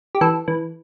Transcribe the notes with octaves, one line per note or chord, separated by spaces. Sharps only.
G4
E3 A4
E3